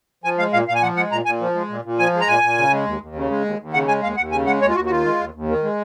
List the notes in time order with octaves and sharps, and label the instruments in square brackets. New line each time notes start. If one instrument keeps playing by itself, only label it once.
[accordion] F3 G#5
G#3 F5
A#2 F5
A#2 F5
G#5
F3 F#5
G#3 F#5
A#2 A#5
A#2 G#5
F3
G#3
A#2
A#2
F3 G#5
G#3
A#5
A#2 G#5
A#2
C#3
G#3
D#2
D#2
C#3
G#3
D#2
D#2
C#3 F#5
G#3 G#5
D#2 F5
D#2 F#5
C#3 G#5
G#3 F#5
D#2 C#5
F4
D#2 F#4
F#4
D#3 F4
G#3
D#2
D#2
D#3
G#3